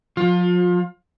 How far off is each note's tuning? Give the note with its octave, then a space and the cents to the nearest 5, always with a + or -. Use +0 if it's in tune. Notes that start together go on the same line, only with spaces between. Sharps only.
F3 +35 F4 +25